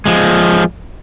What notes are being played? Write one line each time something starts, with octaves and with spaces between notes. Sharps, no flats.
F3 G#3